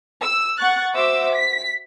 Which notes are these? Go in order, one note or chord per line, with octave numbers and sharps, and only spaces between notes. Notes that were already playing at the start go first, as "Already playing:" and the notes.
E6
F#5 C#6 F#6 A6
F#4 C5 E5 D6 E6
B6